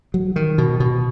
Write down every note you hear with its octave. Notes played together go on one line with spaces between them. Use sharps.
F#3
D#3
B2
B2